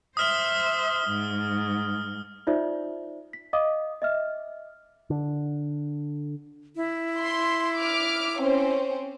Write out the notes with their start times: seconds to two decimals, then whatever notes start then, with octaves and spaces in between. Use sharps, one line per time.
0.17 C5 E5 D#6 F6 G7
1.07 G#2
2.47 D#4 F4 C5 D5 E5
3.33 B6
3.53 D#5 F5 D6 D#6
4.02 D#5 E5 F6
5.10 D3
6.76 E4
7.19 C6
7.77 D6 F6
8.37 C4 C#4 C5